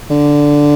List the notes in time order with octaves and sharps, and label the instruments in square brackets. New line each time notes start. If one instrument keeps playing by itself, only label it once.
[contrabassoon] D3